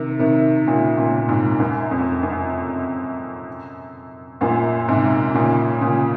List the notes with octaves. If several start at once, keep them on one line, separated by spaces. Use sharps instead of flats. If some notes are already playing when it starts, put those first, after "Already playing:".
Already playing: C3 D#3
C3 D#3
A#2 C#3
A#2 C#3
A#2
G#2 C3
F#2
F2
F#2
F#2 A#2
G#2 C3
A#2 C#3
A#2 C#3